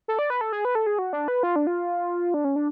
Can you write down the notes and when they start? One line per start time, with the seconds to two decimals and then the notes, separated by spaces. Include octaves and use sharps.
0.08 A4
0.19 D5
0.30 B4
0.41 A4
0.53 G#4
0.65 B4
0.75 A4
0.87 G#4
0.99 F#4
1.13 D4
1.28 B4
1.43 F4
1.56 D4
1.67 F4
2.34 D4
2.45 C#4
2.56 D4